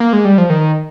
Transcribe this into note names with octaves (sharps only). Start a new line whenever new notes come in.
A#3
G#3
G3
F3
D#3